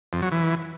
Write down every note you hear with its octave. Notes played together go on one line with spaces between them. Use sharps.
F2
F#3
E3